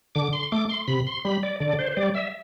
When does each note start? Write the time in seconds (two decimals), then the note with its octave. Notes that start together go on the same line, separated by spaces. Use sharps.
0.15 D3 D6
0.33 C6
0.52 A3 D6
0.69 C6
0.88 C3 B5
1.07 C6
1.25 G3 B5
1.43 D5
1.60 D3 D5
1.79 C5
1.92 C5
1.97 G3 D5
2.15 E5